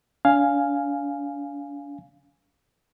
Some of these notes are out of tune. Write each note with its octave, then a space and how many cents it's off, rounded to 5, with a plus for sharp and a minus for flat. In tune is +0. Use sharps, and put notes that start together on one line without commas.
D4 -40 F5 +0 G#5 +0